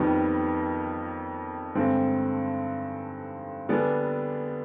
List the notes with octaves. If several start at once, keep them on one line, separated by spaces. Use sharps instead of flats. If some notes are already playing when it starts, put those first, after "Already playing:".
Already playing: F2 D#3 G3 B3
G2 D3 G#3 C4
D3 G3 B3 D4 G#4